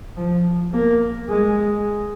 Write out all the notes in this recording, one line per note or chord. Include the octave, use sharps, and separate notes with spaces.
F3
A#3
G#3